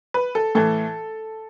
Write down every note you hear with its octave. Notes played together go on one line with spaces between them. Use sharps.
B4
A4
A2 E3 A4